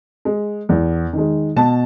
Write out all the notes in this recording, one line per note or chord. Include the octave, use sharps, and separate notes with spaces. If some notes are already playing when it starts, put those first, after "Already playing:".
G#3
E2
D#3 G#3
B2 A5